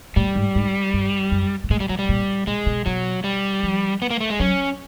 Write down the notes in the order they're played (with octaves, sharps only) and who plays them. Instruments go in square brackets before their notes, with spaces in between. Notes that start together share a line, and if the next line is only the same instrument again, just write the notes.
[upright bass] A2 [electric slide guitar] G3
[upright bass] G#2
G#2
G2
F#2
A#2
[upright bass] A2 [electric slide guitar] G#3
[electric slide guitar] G3
[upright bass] B2 [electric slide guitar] F#3
[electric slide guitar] G3
[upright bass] A#2
[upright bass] A#2 [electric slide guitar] G#3
[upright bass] B2
[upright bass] B2 [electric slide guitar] F#3
[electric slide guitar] G3
[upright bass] F3
[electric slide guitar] B3
A#3
A3
G#3
[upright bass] F#3 [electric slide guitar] C#4